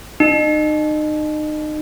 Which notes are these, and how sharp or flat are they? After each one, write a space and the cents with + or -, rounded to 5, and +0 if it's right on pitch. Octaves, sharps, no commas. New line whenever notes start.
D#4 -35